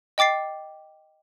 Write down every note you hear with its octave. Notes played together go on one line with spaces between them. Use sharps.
D#5 G5 D6 A6 C7